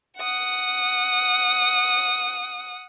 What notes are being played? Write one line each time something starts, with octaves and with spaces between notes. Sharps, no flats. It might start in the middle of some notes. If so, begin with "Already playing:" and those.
F#5 D#6